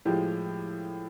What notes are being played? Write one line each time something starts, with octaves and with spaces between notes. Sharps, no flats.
A2 F3 G#3 G4